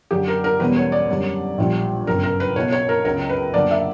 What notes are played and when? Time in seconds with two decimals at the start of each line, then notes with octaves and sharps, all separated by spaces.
0.11 F#2 D3 F#3 G4
0.28 A#4
0.44 A#4
0.59 E2 B2 G3 C#4 B4
0.76 C#5
0.92 D5
1.09 F#2 D3 G3 C#4
1.58 A#1 A#2 G3
2.07 G1 F#2 C#3 A#4
2.23 A#4
2.40 B4
2.56 B1 B2 F#3 C#5
2.72 C#5
2.89 A#4
3.05 C#2 C#3 F#3 A#4
3.29 B4
3.53 F#2 D3 A#3 D4 D5
3.71 E5